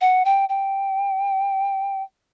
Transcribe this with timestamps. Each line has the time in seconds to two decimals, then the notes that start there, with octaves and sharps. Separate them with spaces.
0.01 F#5
0.25 G5
0.49 G5